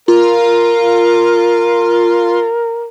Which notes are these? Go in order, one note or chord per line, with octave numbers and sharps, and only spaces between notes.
F4 A#4